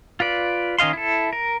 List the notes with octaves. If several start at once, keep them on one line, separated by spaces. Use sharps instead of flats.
F4 B4 D5
D#3 C#4 D#5 F5 C6
E4 A4
A#4